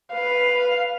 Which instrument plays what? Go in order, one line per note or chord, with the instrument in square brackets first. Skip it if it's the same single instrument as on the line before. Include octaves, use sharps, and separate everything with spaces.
[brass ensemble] B4 [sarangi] F5